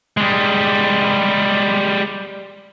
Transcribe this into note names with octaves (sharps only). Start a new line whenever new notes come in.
G3 G#3